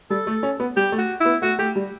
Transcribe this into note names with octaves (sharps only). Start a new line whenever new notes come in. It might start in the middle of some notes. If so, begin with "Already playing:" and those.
G3 A4
A3
C#4
B3
G3 G4
A3
F#4
E4
B3
A3 F#4
A3 G4
G3